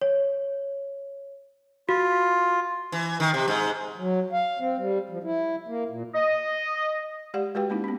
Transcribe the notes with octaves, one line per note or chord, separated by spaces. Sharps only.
C#5
F4 F#4
E3
D#3
C3
G#2
F#3
F5
C4
G3
F3
E4
A#3
A#2
D#5
G#3 G4 D5 F5 F#5
G#3 F#4 G4 B4 F5 G5
G#3 A#3 C#4 D#4 E4
B3 C#4